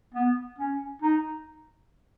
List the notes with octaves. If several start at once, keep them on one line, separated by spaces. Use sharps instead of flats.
B3
C#4
D#4